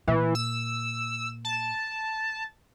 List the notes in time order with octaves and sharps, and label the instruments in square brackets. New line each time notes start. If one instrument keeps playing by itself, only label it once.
[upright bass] A#2 [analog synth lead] E3
[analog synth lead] E6
A5